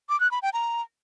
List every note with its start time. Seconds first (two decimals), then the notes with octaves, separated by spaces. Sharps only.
0.09 D6
0.20 F#6
0.31 B5
0.42 G5
0.53 A#5